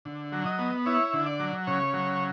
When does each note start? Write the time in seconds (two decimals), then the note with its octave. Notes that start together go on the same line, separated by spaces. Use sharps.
0.05 D3
0.32 F#3
0.46 D#5
0.59 B3
0.86 E4 C#5
1.13 D3
1.26 D5
1.40 F#3
1.67 C#3 C#5
1.94 F#3